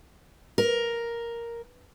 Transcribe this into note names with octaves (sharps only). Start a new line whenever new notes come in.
A#4